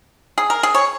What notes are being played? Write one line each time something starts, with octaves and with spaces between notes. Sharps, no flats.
G#4
A#4
G#4
C#5